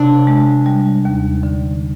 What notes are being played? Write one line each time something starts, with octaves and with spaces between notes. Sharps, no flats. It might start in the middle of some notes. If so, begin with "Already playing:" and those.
Already playing: C3 D4
G#3
G3
D#2
D3